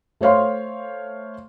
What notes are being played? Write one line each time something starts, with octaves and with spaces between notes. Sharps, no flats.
A3 C5 C#5 F5 C6